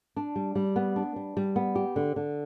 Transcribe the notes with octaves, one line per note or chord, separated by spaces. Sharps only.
D4
G3
G3
B3
D4
G3
G3
B3
G4
D3
D3